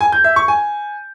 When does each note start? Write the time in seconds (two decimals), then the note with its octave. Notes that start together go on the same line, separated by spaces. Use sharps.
0.01 G#5
0.12 G6
0.24 E5
0.36 C#6
0.48 G#5